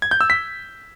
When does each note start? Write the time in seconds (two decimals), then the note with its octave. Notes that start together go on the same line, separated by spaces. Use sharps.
0.02 G#6
0.11 G6
0.21 E6
0.30 B6